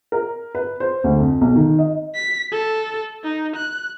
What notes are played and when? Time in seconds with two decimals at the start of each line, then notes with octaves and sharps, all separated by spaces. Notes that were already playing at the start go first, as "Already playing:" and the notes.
0.12 A#4
0.55 B4
0.80 C5
1.04 D2
1.19 F2
1.41 B1
1.56 D#3
1.79 D#5
2.15 B6
2.51 A4
3.24 D#4
3.56 F#6